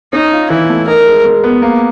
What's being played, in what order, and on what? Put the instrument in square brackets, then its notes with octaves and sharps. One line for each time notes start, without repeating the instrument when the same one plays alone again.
[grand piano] C#4 [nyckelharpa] D#4
[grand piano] F4
[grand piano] E3 [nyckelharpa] E4
[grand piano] A3
[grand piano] D#4 [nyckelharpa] A#4
[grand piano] G#3
G#3
B3
A#3